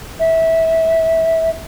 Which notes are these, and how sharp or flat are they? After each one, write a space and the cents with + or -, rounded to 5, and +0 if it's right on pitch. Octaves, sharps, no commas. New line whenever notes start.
E5 -20